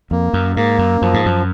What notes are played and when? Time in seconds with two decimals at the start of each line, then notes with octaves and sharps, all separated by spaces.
0.11 F2 A#3
0.33 F#2
0.56 G#2 A#3
0.79 F#2
1.02 F#2 F3
1.14 G#2
1.26 F#2